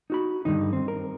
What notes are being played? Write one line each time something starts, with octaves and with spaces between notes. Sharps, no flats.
D#4 F#4 B5
G2 D3 D#3 D#4
C4
A#4